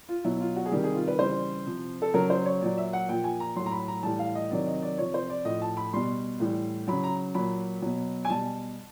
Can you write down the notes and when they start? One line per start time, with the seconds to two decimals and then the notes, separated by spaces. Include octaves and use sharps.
0.09 F4
0.24 B2 F#3 E4
0.40 F4
0.56 F#4
0.66 G#4
0.72 C3 D#3 G3 G4
0.84 G#4
0.95 F4
1.08 B4
1.19 C#3 E3 G3 C5
1.66 C3 F3
2.02 A4
2.14 C#3 F#3 A#4
2.30 C5
2.46 C#5
2.61 A#2 F#3 D5
2.77 E5
2.93 F#5
3.09 A#2 F3 G5
3.24 G#5
3.40 A#5
3.56 A2 F#3 C6
3.66 A#5
3.72 B5
3.88 A#5
4.03 A2 E3 G3 A5
4.19 F5
4.35 D#5
4.51 C3 D#3 F#3 D5
4.67 D#5
4.82 D5
4.98 C3 F3 C#5
5.14 C5
5.30 D5
5.45 A2 F3 D#5
5.61 A5
5.77 B5
5.93 B2 G3 C6
6.40 A2 E3 G3
6.88 C#3 F#3 B5
7.04 A#5
7.35 A#2 F#3 B5
7.82 B2 F#3
8.25 G#5
8.30 B2 G3 A5